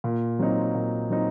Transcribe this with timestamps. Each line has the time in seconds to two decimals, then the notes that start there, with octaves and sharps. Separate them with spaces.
0.04 A#2
0.39 F#3 C4 D#4
0.75 A#2
1.10 F#3 C4 D#4